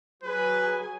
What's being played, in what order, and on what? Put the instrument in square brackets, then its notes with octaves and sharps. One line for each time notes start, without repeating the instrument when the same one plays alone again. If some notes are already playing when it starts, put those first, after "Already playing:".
[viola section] F#3 G#4 G#5 [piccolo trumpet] B4